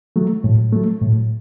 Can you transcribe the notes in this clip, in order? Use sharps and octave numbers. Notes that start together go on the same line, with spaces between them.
F#3 A3
A2
F#3 A3
A2